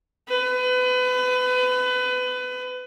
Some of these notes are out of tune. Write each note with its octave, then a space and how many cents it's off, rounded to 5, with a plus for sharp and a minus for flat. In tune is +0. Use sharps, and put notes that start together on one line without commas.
B4 +30